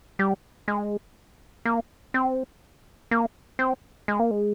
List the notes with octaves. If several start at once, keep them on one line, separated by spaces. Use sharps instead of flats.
G3
G#3
A#3
C4
A#3
C4
G#3
A#3
G#3